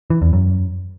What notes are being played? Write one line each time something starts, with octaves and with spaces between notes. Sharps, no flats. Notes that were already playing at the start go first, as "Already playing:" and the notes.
E3
E2
F#2